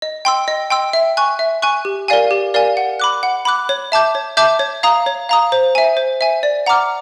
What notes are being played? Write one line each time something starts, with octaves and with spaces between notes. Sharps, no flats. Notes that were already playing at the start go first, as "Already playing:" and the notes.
D#5
G5 C6 E6
D#5
G5 C6 E6
E5
G#5 C#6 F#6
E5
G#5 C#6 F#6
G4
A#4 D5 F5 G#5
G4
A#4 D5 F5 G#5
F#5
B5 D6 F#6
F#5
B5 D6 F#6
C#5
E5 A5 D6 G6
C#5
E5 A5 D6 G6
C#5
F5 A#5 D#6
C#5
F5 A#5 D#6
C5
E5 G#5
C5
E5 G#5
D5
F#5 A#5 D6 F6